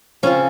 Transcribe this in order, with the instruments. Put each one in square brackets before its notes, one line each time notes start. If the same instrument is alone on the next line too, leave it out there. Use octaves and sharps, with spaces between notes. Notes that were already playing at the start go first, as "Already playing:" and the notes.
[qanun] C#3 F3 C4 F4 [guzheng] C#4